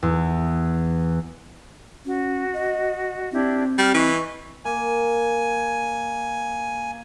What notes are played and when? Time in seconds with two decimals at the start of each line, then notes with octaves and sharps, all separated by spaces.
0.03 E2
2.05 C#4 F#4
2.54 D#5
3.32 C4 D4 E4 G4
3.78 G3 F6
3.94 E3 B4 D#5 C#6
4.65 A#3 G#5